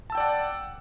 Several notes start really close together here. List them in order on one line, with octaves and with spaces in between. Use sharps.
A5 E6 G5 D5 F#5